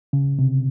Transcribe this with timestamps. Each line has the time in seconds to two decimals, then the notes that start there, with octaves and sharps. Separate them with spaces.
0.13 C#3
0.39 C3